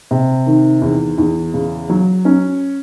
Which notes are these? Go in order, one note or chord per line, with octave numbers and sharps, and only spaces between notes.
C3
D#3
E2
E2
C#3
F#3
C#4